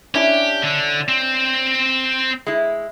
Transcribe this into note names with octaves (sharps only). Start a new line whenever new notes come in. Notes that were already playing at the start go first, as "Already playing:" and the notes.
C#4 D4 E4 G4
D3
C4
G#3 E4